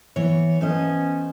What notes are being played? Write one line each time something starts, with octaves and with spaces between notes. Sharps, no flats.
E3 B3 C#5
A3 B3 C#4 C5 D#5